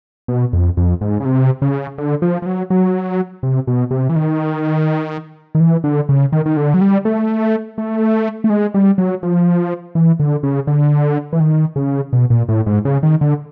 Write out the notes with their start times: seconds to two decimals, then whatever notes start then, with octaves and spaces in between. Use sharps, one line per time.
0.28 B2
0.53 F2
0.77 F2
1.01 G#2
1.20 C#3
1.25 C3
1.62 C#3
1.98 D3
2.22 F3
2.42 F3
2.46 F#3
2.70 F#3
3.43 C3
3.67 B2
3.91 C3
4.09 E3
4.16 D#3
5.55 D#3
5.60 E3
5.84 D3
6.09 C#3
6.32 D#3
6.46 D#3
6.57 D3
6.74 F#3
6.81 G3
7.05 A3
7.78 A3
8.44 A3
8.50 G#3
8.74 G3
8.98 F#3
9.23 F3
9.95 E3
10.20 D3
10.43 C#3
10.67 D3
11.33 E3
11.40 D#3
11.76 C#3
12.13 B2
12.30 A#2
12.49 A2
12.66 G#2
12.85 C#3
13.03 D#3
13.21 D3